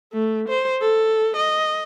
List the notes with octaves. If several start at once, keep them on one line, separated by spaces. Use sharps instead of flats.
A3
C5
A4
D#5